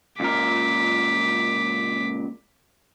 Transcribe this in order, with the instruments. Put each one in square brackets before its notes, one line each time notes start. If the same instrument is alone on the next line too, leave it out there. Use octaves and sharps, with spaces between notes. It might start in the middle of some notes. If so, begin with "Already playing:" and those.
[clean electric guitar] C#2 A#2 A#4 [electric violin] D6 B6